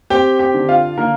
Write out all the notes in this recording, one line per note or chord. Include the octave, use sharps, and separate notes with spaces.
C4 G4 G5
G4 G5
D3
F4 F5
D3 A#3 A#4